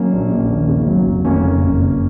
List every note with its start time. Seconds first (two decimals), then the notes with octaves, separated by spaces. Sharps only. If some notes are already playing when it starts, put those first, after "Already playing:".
Already playing: F#3 A#3 C#4
0.12 A#1
0.31 A#1
0.49 D#2
0.68 C#3
0.87 F#3
1.07 F1
1.25 F2 A#3 C#4
1.44 C#3
1.62 F#1
1.82 F#1